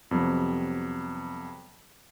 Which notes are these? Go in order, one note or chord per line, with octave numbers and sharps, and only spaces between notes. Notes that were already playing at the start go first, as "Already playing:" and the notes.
F2 C3 F#3 G3 B3